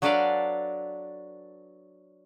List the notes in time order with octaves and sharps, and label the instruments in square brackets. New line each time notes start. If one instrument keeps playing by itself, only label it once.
[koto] F#3 D4 A4 B4 D5 F5